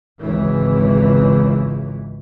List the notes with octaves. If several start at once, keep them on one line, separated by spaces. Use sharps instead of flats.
G#1 C#2 E3